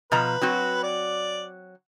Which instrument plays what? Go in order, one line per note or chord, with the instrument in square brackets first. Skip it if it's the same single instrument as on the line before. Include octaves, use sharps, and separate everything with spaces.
[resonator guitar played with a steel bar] B2 F3 A#5 [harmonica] B4
[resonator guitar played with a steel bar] F#3 C4 F#4
[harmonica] D5